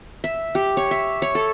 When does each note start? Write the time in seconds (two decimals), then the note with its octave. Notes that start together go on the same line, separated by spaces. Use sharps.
0.24 E5
0.55 G4
0.77 C#5
0.91 E5
1.22 C#5
1.35 A4